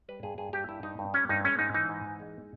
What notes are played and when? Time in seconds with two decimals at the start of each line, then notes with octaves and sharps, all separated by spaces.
0.08 G3 B4
0.23 G2 G#4
0.38 G2 G#4
0.53 G2 G4
0.69 G2 E4
0.83 G2 D#4
0.99 G2
1.14 G3 C#4
1.29 G2 D#4
1.45 G#3 C#4
1.59 G#2 D#4
1.74 E3 D#4
1.89 G#2
2.05 E3
2.20 G#3